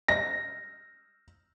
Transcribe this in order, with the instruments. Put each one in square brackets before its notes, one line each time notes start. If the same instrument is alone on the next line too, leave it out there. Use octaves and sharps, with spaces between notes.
[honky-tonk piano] A#6